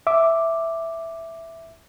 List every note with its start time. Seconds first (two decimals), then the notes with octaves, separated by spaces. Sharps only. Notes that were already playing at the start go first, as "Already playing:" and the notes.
0.07 E5 D6